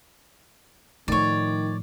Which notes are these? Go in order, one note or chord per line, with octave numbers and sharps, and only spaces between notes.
A2 D#3 F3 C#5 D5